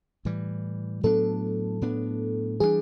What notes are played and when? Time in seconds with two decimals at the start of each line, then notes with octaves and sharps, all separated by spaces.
0.25 A2 E3 G3
1.03 A2 F#3 B3 D4 A4
1.82 A2 F#3 B3 D4
2.60 E3 G3 A#3 D4 G#4